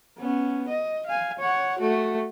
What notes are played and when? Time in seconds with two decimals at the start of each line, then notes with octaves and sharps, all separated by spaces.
0.18 B3 C#4
0.68 D#5
1.07 F5 G#5
1.39 C#5 F#5
1.79 A3 F#4